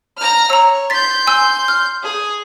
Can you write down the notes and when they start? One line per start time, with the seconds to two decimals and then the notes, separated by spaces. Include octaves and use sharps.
0.18 A#5 F6
0.50 C#5 A#5 E6
0.90 C6 G6 A6 B6
1.27 G#5 E6
1.68 F6
2.03 G#4